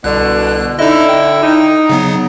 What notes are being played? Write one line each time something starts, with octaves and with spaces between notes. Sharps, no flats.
C2 B2 D3 F#6
D3 D#4 E4 D#5
G5
D#4
C#3 F#3 B3